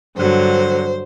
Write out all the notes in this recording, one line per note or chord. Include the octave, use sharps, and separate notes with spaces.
G2 D3 F#3 C5